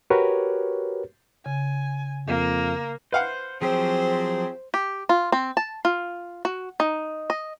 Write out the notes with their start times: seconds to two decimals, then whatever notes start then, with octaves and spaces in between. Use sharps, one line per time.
0.10 F#4 G4 A#4 B4 C#5
1.46 C#3 G#5
2.28 F2 A#3
3.12 B4 C5 F5 F#5
3.62 F3 F#3 C4 G4 G#4 C5
4.74 G4
5.09 F4
5.32 C4
5.57 A5
5.85 F4
6.45 F#4
6.80 D#4
7.30 D#5